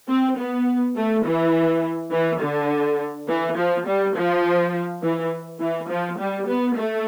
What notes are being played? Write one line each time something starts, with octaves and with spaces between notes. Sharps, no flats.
C4
B3
A3
E3
E3
D3
E3
F3
G3
F3
E3
E3
F3
G3
B3
A3